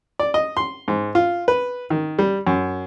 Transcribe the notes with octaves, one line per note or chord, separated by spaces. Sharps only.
D5
D#5
C6
G#2
F4
B4
D#3
G3
F#2